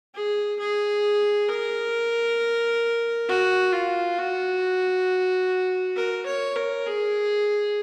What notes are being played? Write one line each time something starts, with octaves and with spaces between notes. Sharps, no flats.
G#4
G#4
A#4
F#4
F4
F#4
A#4
C#5
A#4
G#4